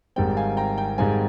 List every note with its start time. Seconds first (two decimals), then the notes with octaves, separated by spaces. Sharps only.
0.16 G#1 G#2 G3 C4 G5
0.37 F5 G#5
0.57 G5 A#5
0.78 G5
0.98 G#1 G#2 G3 C4 F5 G#5